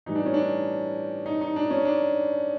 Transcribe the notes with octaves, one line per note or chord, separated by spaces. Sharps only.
A2 E3 G3 D#4
D4
C#4
D4
D#4
D#4
D4
C#4
D4